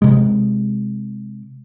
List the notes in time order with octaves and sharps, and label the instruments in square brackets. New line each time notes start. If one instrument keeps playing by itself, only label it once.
[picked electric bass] C3 G#3